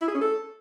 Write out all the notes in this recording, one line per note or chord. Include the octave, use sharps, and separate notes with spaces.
E4
G#4
C#4
A4